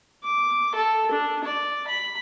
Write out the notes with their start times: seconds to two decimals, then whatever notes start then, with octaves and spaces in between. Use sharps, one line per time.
0.23 D6
0.75 A4
1.11 D4
1.44 D5
1.87 B5